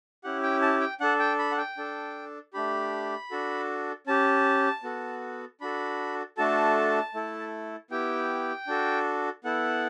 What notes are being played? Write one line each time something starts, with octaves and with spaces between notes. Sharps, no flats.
C#4 E4 G4 F#5
G5
A5
G5
D4 A4 F#5
G5
B5
F#5
G5
D4 A4
A3 D4 G4 B5
D4 F#4 A4
C#4 G4 A5
B3 F#4 A4
D4 F#4 A4 B5
A3 D4 F#4 A4 A5
A3 E4 A4
B3 E4 G4 G5
D4 F#4 A4
B3 E4 A4 F#5